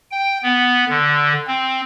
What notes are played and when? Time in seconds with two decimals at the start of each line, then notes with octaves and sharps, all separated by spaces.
0.11 G5
0.43 B3
0.89 D3
1.48 C4